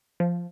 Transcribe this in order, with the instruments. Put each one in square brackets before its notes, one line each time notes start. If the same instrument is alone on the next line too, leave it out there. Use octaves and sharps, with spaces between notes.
[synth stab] F3